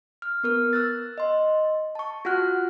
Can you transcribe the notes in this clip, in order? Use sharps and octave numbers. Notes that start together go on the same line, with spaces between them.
F6
B3 A#4 F6
E6 F#6 A6
D#5 C6
A5 C#6
F4 F#4 F#5 F6 F#6